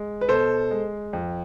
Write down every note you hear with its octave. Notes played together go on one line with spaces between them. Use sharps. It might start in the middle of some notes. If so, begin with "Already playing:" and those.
Already playing: G#3
B4
B2 A4 C5
G#3
F2